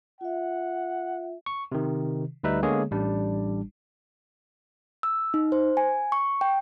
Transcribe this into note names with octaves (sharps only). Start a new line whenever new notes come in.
F4 E5 F#5
C#6
C3 D#3
D2 G3 D#4 B4 E5
D3 G#3 A#3 B3 G#4 C#5
A1 G3 D4
E6
D#4
C5
G#5
C#6
G5